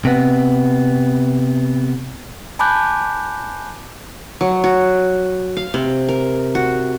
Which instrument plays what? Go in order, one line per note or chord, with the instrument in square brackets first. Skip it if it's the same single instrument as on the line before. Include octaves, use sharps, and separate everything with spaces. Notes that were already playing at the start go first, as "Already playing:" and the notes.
[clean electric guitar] C3 B3
[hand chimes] G#5 A5 B5 D6 F#6 G6
[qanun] F#3
F#4
F5
C3
A#4
F#4